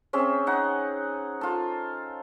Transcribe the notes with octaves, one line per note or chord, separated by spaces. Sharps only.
C4 C#4 G#4 E5
D#4 F#5
F4 A4